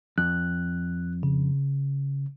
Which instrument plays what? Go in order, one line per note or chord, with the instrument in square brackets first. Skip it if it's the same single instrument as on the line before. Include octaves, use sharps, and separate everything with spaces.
[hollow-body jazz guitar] F2 [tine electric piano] F#6
[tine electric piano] C#3